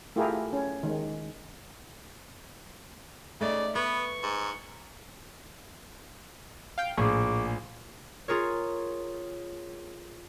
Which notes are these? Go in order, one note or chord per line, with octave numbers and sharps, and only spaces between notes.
A3 E4 F4 G4 G#4 A#4
C#4
D#3 G#3
C#3 A3 D#4 D5
B3 B4 C#6
G#2
F5 G5
A#1 A2 G#4 C#6 D6
F4 G#4 A#4 C#5